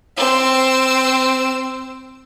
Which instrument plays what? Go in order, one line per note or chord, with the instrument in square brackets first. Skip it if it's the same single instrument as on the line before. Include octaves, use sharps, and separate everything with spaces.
[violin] C4 E6